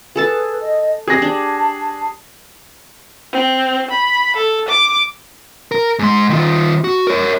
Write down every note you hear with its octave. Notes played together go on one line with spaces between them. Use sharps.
G#4 A4 B4 A5
D#5
C4 G4 G#4 A#6
D4 A5
C4
B5
A4
D6
A#4
G#2 C6
D#3 F4
F#4
A#4 C#5